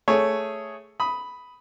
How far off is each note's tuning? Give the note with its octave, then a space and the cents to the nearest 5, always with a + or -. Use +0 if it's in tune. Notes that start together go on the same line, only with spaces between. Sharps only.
A3 +0 G#4 +0 C#5 +0
B5 +0 D#6 +10